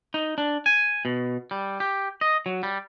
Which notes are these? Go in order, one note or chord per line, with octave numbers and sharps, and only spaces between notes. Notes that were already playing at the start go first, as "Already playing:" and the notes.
D#4
D4
G#5
B2
G3
G4
D#5
F#3
G3